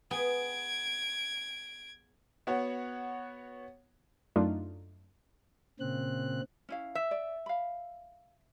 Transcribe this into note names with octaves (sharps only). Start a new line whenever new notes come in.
B3 G#4 G5 G#6 D7
B3 F#4 C#5 F#5
F#2 A3 D4 D#4 F4
A#2 C#3 C4 F#6
C#4 E4 F5
E5
D5
F5 B5